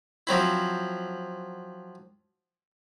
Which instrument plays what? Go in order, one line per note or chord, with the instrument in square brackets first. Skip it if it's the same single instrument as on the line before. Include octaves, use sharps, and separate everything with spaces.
[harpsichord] F3 F#3 C4 E4